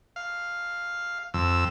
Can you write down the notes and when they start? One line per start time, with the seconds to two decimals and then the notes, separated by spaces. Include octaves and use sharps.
0.16 F5
1.34 F2 E6